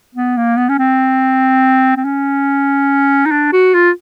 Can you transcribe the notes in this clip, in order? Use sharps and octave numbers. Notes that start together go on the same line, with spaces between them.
B3
A#3
B3
C#4
C4
C4
C#4
D#4
D4
F#4
F4